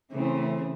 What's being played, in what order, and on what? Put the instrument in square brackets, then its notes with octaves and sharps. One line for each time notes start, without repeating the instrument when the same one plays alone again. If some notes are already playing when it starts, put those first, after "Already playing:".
[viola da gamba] C#3 [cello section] E3 A3 C4